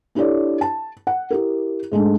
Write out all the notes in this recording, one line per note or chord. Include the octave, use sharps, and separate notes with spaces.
D4 E4 G4 A4 C#5 D5
A5
F#5
E4 G4 A#4
G#2 G#3 A3 D4